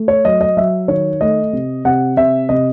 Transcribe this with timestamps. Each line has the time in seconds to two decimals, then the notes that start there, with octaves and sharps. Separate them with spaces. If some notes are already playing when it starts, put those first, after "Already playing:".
Already playing: A3
0.08 C#5
0.25 F#3 D#5
0.41 D#5
0.57 F#3 E5
0.88 D#3 C#5
1.21 A3 D#5
1.53 C3
1.85 C3 F#5
2.17 C3 E5
2.49 C3 D#5